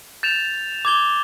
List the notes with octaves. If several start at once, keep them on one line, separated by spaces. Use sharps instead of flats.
G6 A6 E7 F7
D6 G#6 G7